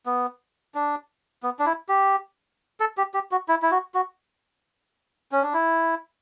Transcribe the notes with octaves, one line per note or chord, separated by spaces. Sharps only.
B3
D4
B3
D4
E4
G4
A4
G4
G4
F#4
E4
E4
F#4
F#4
C#4
D4
E4